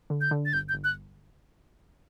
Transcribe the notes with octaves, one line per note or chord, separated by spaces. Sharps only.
D3
G6
D3
A6
G1 G6
G6
G1
F#6